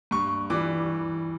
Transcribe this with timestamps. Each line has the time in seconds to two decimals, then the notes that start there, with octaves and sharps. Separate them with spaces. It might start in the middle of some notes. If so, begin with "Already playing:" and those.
0.11 G2 C#6
0.50 E3 G3 D6